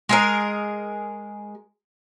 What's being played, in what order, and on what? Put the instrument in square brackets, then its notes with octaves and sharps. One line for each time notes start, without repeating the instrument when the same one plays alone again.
[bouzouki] G#3 G#4 A#4